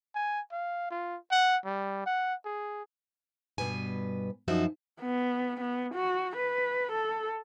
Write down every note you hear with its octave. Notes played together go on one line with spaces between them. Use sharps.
G#5
F5
F4
F#5
G3
F#5
G#4
G2 B2 B4 G#5
F#2 F3 D#4 F#4 E5
B3
B3
F#4
B4
A4